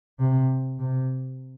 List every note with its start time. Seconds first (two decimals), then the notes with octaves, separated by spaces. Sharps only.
0.19 C3
0.79 C3